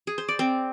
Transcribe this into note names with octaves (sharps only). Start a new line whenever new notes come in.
G#4
C5
D5
C4